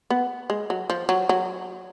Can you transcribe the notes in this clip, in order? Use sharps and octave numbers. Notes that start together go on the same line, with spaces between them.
B3
G#3
F#3
F3
F#3
F#3